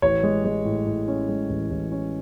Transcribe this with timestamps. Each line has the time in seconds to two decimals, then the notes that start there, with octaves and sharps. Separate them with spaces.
0.02 A1 C#5
0.23 G#3
0.45 G#3
0.65 A2
0.86 A2
1.08 C#4
1.29 G#3
1.50 A1
1.70 A1
1.92 C#4